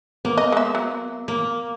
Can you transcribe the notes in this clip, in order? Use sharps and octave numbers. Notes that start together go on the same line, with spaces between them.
A#3 B3
D#5
G#3 E5
F#3
A#3